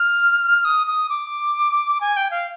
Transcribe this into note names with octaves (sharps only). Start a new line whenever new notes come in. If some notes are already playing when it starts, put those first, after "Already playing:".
Already playing: F6
D#6
D#6
D6
G#5
G5
F5